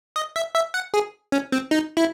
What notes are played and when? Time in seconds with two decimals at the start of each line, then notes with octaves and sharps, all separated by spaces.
0.16 D#5
0.36 E5
0.55 E5
0.74 F#5
0.94 G#4
1.32 C#4
1.52 C4
1.71 D#4
1.97 E4